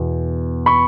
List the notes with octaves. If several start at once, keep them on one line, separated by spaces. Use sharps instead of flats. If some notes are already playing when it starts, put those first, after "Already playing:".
Already playing: E2 B2
B5 C#6